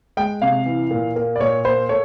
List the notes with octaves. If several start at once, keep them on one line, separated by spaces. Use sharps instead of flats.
G#3 G5
C3 F5
E3
A#2
A#3
D5
A#2 C#5
A#3 C5
A3 C#5